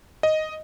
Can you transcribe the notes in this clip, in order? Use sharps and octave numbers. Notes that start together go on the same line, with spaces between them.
D#5